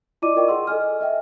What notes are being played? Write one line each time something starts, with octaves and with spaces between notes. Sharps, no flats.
E4 F4 D5 D#5 D6 D#7
A#4 D5 D#5 G5 C#6 D6
G#4 F#5 C6 E6
A4 D#5 G#5 F6
D#5 E5 G5